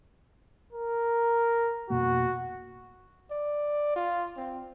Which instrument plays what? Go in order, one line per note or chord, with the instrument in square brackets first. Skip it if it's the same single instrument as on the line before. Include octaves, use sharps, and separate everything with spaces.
[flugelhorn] A#4
[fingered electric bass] F2 B2 A#3 [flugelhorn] F#4
[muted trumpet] D5
F4
C4